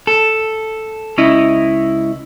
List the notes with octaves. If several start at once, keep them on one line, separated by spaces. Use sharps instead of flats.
A4
C#2 C#4 E4 D#5